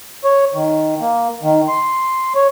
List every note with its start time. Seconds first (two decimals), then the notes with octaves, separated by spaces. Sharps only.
0.24 C#5
0.54 D#3
1.01 A#3
1.43 D#3
1.68 C6
2.35 C#5